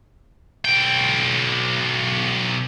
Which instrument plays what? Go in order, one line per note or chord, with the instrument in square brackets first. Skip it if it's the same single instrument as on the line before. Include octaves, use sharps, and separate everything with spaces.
[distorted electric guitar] B1 G5